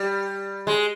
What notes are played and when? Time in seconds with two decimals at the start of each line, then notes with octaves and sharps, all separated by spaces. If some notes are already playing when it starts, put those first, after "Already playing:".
Already playing: G3
0.67 G#3